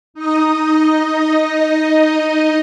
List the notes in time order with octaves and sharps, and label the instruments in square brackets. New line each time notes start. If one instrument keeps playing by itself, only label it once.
[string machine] D#4 D#5